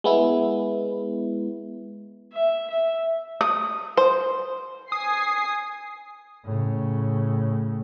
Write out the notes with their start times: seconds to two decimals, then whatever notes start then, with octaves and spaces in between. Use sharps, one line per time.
0.04 G#3 B3 E4
2.33 E5
2.70 E5
3.41 D#6
3.97 C5
4.92 G#5 D#6 C7
6.45 A2 C#3